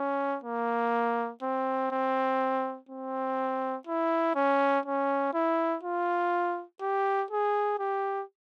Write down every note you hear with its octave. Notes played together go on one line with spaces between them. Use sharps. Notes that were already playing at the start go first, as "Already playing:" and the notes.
Already playing: C#4
A#3
C4
C4
C4
E4
C#4
C#4
E4
F4
G4
G#4
G4